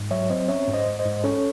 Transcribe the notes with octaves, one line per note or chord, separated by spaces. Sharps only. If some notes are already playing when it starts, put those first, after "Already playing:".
Already playing: G#2
F#3 C#5 E5
C4 C5 D#5
C#4 C#5 E5
G#2
C5 D#5
G#2
C5 D#5
G#2
C#4 A4 C#5